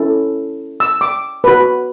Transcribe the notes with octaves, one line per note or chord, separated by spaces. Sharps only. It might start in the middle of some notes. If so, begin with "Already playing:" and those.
Already playing: C#4 E4 A4
E6
D6
F#4 B4